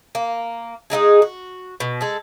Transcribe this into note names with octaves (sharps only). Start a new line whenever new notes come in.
A#3
G#3 A3 D#4 G#4
F#4
B2
G#3 A4